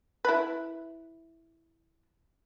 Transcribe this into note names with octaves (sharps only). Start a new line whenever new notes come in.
E4 B4